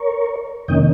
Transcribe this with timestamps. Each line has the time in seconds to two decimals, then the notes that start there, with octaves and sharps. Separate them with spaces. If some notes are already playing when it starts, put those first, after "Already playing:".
Already playing: A#4 C#5
0.68 F2 C3 D#3 A#3 C#4 D#5 G5